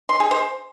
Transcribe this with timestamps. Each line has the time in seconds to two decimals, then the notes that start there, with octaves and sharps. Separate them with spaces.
0.09 C6
0.20 G#4
0.31 C5